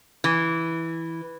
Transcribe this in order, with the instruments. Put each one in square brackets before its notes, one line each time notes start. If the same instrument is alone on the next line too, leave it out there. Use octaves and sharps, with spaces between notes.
[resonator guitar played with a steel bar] E3